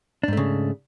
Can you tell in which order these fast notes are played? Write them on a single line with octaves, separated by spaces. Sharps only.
D4 G#2 A3 C#3